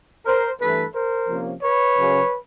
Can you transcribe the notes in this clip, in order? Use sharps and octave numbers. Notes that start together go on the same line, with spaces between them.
A#4 C5
G2 E3 A3 A4 B4
A#4 C5
C3 F3 A#3 C#4
B4 C#5
F#2 C#3 F#3